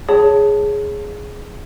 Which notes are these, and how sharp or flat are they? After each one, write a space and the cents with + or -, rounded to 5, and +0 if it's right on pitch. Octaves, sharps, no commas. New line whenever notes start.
G#4 +0 C#5 +0 A5 +0